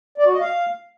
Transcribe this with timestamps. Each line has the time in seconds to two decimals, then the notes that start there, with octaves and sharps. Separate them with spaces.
0.18 D5
0.25 F#4
0.33 D#5
0.40 F5